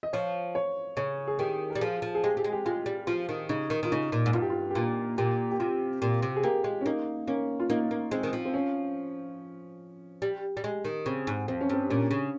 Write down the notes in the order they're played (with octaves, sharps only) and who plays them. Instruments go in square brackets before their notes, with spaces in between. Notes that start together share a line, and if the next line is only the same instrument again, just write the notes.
[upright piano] D#5
[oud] F3 [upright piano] C#5
[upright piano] C#5
[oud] C#3 [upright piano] C#5
[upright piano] G#4
[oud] D#3 [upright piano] G4
[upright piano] A#4
[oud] G3
[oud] F3 [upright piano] G#4
[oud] F3
[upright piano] G#4
[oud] G#3 [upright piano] G4
[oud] G3 [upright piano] G#4
[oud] G#3
[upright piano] G4
[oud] G#3 [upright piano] F4
[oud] G3
[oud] F3 [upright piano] F4
[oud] D#3
[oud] C#3 [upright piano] D#4
[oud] D#3
[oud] D#3 [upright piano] F4
[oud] C#3 [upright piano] D#4
[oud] A#2
G#2
[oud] G2 [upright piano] F4
[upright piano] G4
F4
G4
[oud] A#2 [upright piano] F4
[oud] A#2 [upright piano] G4
[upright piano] G4
[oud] C3 [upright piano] F4
[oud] A#2 [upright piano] G4
[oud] C3
[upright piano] G#4
[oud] A#3 [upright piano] G4
[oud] G#3
[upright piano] C#4
[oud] A#3 [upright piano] D#4
[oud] A#3 [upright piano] C#4
[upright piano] F4
[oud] A#3 [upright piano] D#4
[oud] A#3
[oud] G#3 [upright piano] C4
[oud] D#3
F3
[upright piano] C4
C#4
[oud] G3
G3
G#3
D#3
[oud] C#3 [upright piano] C4
[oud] G#2
[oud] F2 [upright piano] C4
[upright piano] C#4
[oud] G2 [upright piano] C4
[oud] A#2 [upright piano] C#4
[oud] C#3